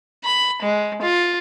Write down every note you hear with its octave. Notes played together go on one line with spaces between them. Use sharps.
B5
G#3
F4